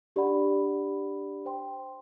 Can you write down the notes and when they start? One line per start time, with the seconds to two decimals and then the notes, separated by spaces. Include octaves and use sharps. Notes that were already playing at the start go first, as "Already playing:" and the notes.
0.16 D4 G4 D5 F#5 B5
1.46 C5 G5 C6